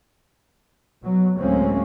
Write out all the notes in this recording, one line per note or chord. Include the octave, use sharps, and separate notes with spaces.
B2 F#3
D2 A2 G#3 A#3 C4 C#4